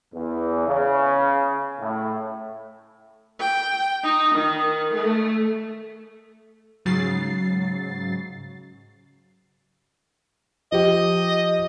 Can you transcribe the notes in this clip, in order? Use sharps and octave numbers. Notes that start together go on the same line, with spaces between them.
E2
C#3
A2
G5
D#4
D#3
A3
G#2 C#3 F#3 A6 C7
F3 G4 D#5